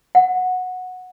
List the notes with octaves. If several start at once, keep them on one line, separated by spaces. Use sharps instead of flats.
F#5